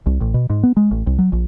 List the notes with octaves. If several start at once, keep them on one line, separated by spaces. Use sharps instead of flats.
C2
A1
B2
G#2
B3
G#3
A1
C2
F#3
A#1